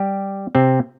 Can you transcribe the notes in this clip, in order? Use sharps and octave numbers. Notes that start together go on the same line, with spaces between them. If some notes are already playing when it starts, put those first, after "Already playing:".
Already playing: G3 G4
C3 C4